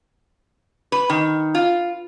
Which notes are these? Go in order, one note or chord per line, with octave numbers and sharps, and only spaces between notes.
B4
D#3
F4